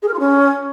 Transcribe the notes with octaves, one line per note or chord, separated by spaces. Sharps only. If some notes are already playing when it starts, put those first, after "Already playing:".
G#4
A#4
F4
C#4